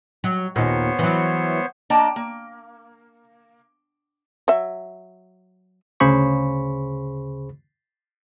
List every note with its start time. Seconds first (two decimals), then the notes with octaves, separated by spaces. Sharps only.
0.24 F#3
0.56 D#2 A#2 B3 C5 C#5
0.99 E3 F#3
1.90 A#3 D4 D#5 G5 A5 A#5
2.16 A#3
4.48 F#3 E5
6.00 D2 C#3 G#4 C5 B5 C#6